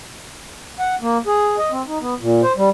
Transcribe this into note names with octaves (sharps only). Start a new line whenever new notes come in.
F#5
A#3
G#4
D#5
C4
D#4
B3
A#2
C5
G3